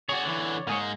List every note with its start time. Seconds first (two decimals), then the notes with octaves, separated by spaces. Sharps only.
0.09 F#4 G#4 C#5 D5
0.23 D3 E3
0.67 G#2 G#3 A#3 G#4 C#5
0.82 A#3